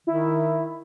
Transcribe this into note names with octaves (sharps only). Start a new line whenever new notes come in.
D#3 E4